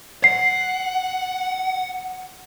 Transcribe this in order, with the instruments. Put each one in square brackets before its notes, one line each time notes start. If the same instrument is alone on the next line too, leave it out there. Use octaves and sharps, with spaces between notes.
[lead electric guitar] F#5 [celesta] C7